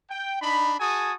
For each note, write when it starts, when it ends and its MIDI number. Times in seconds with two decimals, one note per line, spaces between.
0.10 0.37 79
0.42 0.74 62
0.42 0.74 63
0.42 0.74 83
0.80 1.12 66
0.80 1.12 68
0.80 1.12 80
0.80 1.12 81
0.80 1.12 87